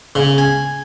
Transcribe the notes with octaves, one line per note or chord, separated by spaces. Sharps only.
C#3
G#5